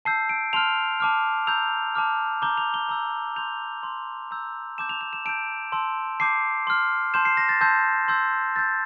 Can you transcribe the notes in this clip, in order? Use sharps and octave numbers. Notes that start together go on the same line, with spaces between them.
A5 E6 G6 C7
D7
A5 C6 F6 F7
A5 D6 F6
A#5 E6 G6 F7
A5 D6 F6
A#5 D6 G6 G7
F7
G7
A#5 E6 G6
C6 G6 F7
C6 G6
A#5 E6 G6
A5 D6 G6 E7
F7
F7
E7
A5 E6 G6 D7
A5 C6 E6
A5 D6 G6 C7
C6 F6
A5 C6 G6 E7
C7
A#6
A6
A5 C6 E6 G6
C6 E6 G6
C6 E6 G6 A6